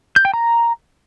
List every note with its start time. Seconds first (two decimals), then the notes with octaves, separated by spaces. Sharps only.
0.16 G6
0.25 G5
0.34 A#5